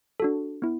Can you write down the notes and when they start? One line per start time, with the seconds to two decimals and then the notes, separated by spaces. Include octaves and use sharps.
0.20 D4 F#4 A4
0.62 B3 E4